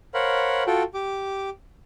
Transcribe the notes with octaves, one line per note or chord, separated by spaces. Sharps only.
A#4 C5 C#5 F5 F#5 B5
F4 F#4 A4 G5
G4 D6